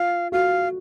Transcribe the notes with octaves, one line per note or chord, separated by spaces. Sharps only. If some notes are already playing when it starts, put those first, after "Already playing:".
Already playing: F4 F5
F#4 F5